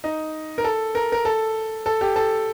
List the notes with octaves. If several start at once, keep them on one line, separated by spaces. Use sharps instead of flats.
D#4
A#4
A4
A#4
A#4
A4
A4
G4
A4